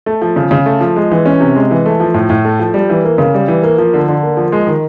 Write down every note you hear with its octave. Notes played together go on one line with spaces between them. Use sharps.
A3
F3
C#3
C#3
A3
F3
G#3
E3
C#4
C3
G#3
E3
A3
F3
A2
A2
A3
F3
G3
E3
A#3
C#3
G3
E3
A#3
F3
D3
D3
A#3
F3
G#3
D#3